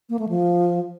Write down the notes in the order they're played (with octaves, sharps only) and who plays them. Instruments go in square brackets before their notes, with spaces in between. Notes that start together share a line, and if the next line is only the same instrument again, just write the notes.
[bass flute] A#3
A3
F3